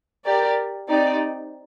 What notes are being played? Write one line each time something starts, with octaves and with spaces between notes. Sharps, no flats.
G4 A#4 D5
C4 D#4 G4 D5